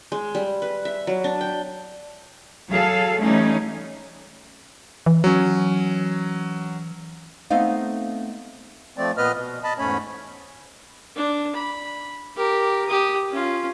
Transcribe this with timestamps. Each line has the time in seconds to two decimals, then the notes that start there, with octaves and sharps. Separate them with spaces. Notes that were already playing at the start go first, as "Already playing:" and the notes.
0.12 G#3
0.35 G3
0.62 B4
0.85 E5
1.07 F#3
1.24 D4
1.41 G5
2.69 F#3 G#4 A4 F5
3.21 E3 G3 A3 C#4 D#4
5.06 E3
5.24 F#3 C#4
7.50 A3 B3 C4 D#4 D#5 F5
8.98 F3 A3 C4 D5
9.17 A#2 B3 B4 D#5 F6
9.35 B2
9.64 D#5 A5 B5
9.79 E2 G#2 A3 C#4 C#5 B5
11.16 D4
11.55 B5
12.36 G4 A#4
12.88 G4 D#6
13.30 C#4 F4